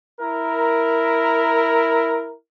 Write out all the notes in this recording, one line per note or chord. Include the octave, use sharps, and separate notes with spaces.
E4 A#4